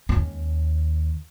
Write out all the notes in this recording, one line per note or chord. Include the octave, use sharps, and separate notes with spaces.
D#2 C#4